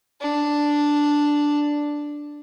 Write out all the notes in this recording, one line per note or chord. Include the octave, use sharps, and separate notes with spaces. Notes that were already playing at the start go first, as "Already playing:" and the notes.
D4